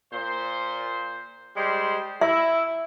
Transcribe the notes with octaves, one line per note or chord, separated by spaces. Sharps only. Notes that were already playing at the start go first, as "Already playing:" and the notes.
A#2 C5
G3 G#3 C5
E4 E5